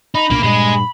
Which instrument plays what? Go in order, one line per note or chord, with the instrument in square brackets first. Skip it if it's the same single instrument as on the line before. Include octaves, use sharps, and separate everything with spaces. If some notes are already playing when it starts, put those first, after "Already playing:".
[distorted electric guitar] D#4 [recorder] B5
[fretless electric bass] B1 A#2 D4 [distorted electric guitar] A#3
[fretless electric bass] G2 A#2 [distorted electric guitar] G#3 G#4